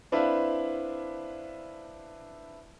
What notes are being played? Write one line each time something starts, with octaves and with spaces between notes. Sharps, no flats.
C4 D4 E4 B4 E5 F5